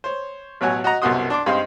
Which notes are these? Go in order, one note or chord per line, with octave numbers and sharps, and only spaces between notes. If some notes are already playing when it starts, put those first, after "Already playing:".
C5 C#5
A1 B2 F#3 C#5 F#5 G#5
F#4 D#5 F#5 A#5
C2 F#2 B2 F#4 C6 D#6
D4 C6 D6
G2 G#3 C4 D#4 F5 C6